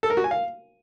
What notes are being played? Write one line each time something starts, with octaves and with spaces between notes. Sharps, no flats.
A4
A#4
F#4
G#5
F5